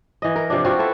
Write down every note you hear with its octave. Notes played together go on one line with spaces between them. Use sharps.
E3 D#5
A#4
C3 F3 D4
C4 F4 F#4 C#5
E4 A4 B4